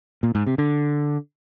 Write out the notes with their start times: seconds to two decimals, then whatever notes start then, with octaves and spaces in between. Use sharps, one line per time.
0.23 A#2
0.35 G#2
0.47 C3
0.58 D3